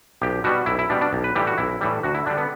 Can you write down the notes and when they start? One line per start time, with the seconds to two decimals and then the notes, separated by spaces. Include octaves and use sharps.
0.21 B1 G4
0.44 B2 G3 F#4
0.66 B1 E4
0.79 E4
0.90 B2 G3 D4
1.01 D4
1.13 B1
1.24 B4
1.36 A2 E3 G3 G4
1.47 F#4
1.58 B1 E4
1.81 A2 E3 G3
2.03 D2 F#4
2.15 E4
2.26 D3 G3 D4
2.38 B3